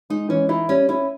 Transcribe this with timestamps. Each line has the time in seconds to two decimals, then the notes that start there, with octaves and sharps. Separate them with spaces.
0.10 G#3 D#4
0.29 E3 C#4
0.49 D#4 E4
0.69 G3 C#4
0.89 C#4 E4